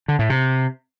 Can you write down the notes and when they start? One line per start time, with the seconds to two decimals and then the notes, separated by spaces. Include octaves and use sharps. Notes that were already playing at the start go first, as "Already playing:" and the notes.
0.08 D3
0.19 A2
0.30 C3